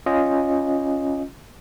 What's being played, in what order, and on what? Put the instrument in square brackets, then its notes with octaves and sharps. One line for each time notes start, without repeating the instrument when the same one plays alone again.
[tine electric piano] C#4 F4 D#5